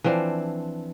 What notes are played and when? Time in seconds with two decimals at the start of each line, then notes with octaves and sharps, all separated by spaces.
0.04 E3 F3 C4 D4